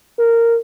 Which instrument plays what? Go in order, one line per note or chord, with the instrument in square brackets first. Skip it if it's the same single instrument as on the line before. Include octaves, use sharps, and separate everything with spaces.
[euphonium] A#4